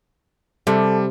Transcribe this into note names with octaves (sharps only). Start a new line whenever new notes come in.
C3 G3 A4